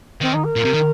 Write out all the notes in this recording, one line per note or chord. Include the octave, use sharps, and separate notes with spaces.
D#3 C4
D#4
A#4
A#2
C3
D#3